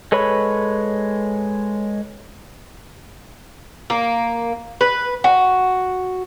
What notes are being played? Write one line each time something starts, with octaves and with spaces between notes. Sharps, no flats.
G#3 A4 B4 C#5 B5
A#3
B4
F#4